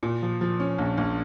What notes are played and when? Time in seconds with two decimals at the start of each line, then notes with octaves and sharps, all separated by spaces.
0.03 A#2
0.22 F3
0.41 F3
0.60 C#4
0.78 A#1
0.97 A#1